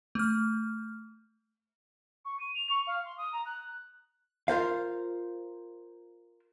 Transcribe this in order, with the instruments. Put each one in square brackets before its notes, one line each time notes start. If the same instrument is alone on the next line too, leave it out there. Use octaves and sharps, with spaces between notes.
[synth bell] A3 F6
[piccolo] C#6
D#7
F7
C#6
F5
C6
D#6
A#5
F#6
[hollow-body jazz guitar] F4 A#4 C5 F5